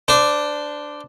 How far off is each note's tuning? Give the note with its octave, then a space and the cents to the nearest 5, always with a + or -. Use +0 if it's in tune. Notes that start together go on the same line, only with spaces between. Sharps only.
D4 +0 C5 -25